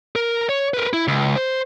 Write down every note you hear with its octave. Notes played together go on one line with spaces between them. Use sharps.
A#4
C#5
A#4 B4
E4
C#2
C5